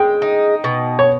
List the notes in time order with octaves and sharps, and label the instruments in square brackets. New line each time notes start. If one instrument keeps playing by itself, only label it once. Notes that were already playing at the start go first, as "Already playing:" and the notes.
Already playing: [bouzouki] G#3 [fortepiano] G5
[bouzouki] D#4
B2
[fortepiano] C#5